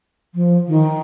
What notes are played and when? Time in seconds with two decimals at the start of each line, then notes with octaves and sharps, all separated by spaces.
0.35 F3
0.68 D#3